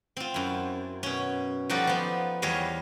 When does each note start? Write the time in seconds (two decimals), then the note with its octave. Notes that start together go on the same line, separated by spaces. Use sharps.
0.17 C4 F4
0.34 F#2 E4
1.03 B2 C#4
1.70 F3 G3 D#4 F#4 A4 D5
1.87 F3 B3
2.42 E2 G3 C#5 D#5 F5